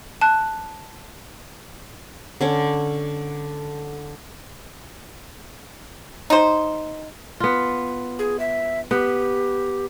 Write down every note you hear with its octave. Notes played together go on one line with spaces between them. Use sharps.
A5 F#6
D3 C#4 C#5
D#4 C5
B3 F4
G#4
E5
B3 G4